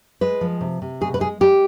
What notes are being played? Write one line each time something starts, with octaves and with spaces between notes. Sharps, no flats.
G#3 B4
F3
C3
C3
B2 G#4
B4
G#3 G#4
G#3 G4